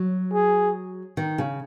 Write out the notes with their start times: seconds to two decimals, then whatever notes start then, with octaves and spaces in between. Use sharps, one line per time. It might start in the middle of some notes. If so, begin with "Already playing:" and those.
Already playing: F#3
0.34 G#4
1.17 D#3
1.38 C#3